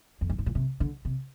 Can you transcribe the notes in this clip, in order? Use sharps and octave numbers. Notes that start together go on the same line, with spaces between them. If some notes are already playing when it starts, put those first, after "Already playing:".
F2
G2
G#2
A#2
C3
D3
C3